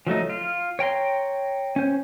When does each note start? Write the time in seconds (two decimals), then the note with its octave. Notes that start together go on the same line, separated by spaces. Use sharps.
0.07 F3 F#3 A3 D#4
0.30 F4
0.79 C#5 G5 A#5 C6
1.76 C#4 C5